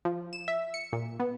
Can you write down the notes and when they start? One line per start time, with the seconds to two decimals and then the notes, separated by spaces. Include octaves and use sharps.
0.05 F3
0.33 E7
0.48 E5
0.74 C#7
0.93 A#2
1.20 B3